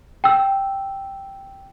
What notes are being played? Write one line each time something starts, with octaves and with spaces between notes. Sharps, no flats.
G5 E6